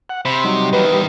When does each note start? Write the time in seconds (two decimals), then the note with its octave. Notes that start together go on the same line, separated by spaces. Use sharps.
0.09 F#5
0.25 C3 C5 B5
0.44 F#3 G3 D#4
0.73 E2 D#3 B4
0.92 G3